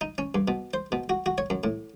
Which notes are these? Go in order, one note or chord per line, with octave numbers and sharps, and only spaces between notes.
D#4
C#4
G2
B2
C5
B2
F#4
F#4
C#5
F#2
A2